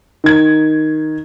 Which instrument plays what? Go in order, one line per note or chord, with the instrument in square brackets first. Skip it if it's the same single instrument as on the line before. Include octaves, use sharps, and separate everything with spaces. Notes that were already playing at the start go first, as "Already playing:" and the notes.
[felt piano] D#3 G#6